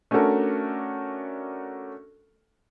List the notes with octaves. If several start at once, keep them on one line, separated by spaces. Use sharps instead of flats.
A3 C#4 D4 F#4 A4 A#4